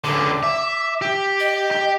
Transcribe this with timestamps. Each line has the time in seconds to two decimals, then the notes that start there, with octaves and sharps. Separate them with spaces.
0.04 C#2 D3 D6
0.43 E5
1.02 G4
1.40 D#5
1.71 G4